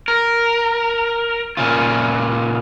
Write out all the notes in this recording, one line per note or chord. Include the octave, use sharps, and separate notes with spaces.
A#4
A#2 C#3 F4